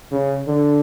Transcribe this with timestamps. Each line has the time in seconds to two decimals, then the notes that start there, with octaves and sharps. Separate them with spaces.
0.12 C#3
0.47 D3